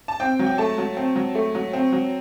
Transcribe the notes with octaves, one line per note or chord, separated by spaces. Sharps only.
A5
C4 G5
F#3
G5
A3 A5
F#3
C4
F#3
A3
F#3
C4
F#3